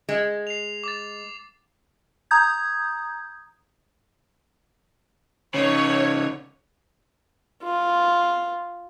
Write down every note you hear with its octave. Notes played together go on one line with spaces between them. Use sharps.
G#3
C7 F7
D6 A6
A#5 D#6 G6 G#6
C#3 D#4 C#5
F4